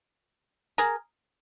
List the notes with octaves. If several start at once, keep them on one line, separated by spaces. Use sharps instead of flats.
G#4 A#4